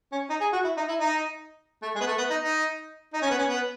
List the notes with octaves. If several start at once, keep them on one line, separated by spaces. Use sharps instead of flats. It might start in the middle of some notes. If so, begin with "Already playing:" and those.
C#4
D#4
G#4
F#4
E4
D#4
E4
D#4
A3
G#3
B3
A3
B3
D#4
D#4
D#4
C#4
B3
C#4
B3